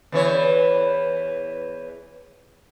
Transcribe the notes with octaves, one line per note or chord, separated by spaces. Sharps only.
E2 E3 C#5